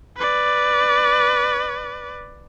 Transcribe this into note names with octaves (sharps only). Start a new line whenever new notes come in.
B4 D5